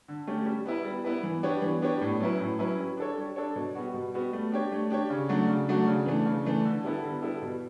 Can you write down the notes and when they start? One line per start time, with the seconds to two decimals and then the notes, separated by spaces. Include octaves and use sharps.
0.08 D3
0.27 A3 C#4 G4
0.46 G3
0.66 B3 E4 B4
0.84 G3
1.05 B3 E4 B4
1.23 E3
1.43 B3 D4 G4 C#5
1.62 E3
1.82 B3 D4 G4 C#5
2.01 A2
2.20 F#3 C#4 E4 B4
2.39 A2
2.59 F#3 C#4 E4 B4
2.78 G3
2.97 D4 A4 C#5
3.17 G3
3.36 D4 A4 C#5
3.56 B2
3.75 G3 B3 F#4
3.94 B2
4.14 G3 B3 F#4
4.33 A3
4.52 D4 G4 C#5
4.72 A3
4.90 D4 G4 C#5
5.10 C#3
5.29 F#3 A3 D4 F#4
5.48 C#3
5.68 F#3 A3 D4 F#4
5.87 C#3
6.06 E3 A3 D4
6.26 C#3
6.45 E3 A3 D4
6.65 D3
6.84 G3 B3 E4 A4
7.03 D3
7.22 G3 B3 E4 A4
7.42 B2